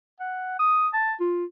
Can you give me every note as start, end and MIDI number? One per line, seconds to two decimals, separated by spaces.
0.20 0.56 78
0.59 0.88 87
0.93 1.14 81
1.20 1.45 65